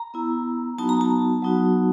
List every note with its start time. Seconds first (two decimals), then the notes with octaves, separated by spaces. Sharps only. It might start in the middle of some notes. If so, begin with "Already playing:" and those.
Already playing: A#5
0.14 B3 E4
0.78 F#3 B3 D#4 F#4 A5
0.89 A#5
1.01 A5
1.42 F#3 B3 D#4 F#4